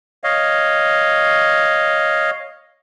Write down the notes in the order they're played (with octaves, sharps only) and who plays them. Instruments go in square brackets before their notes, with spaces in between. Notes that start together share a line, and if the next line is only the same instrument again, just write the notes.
[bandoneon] C#5 D#5 F5